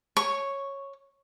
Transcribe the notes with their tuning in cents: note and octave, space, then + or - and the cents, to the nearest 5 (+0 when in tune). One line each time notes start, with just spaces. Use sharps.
C#5 -10 C#6 +0